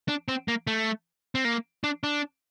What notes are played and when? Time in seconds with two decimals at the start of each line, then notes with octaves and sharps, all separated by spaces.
0.08 D4
0.28 C4
0.48 A#3
0.67 A3
1.35 C4
1.45 A#3
1.84 D4
2.04 D4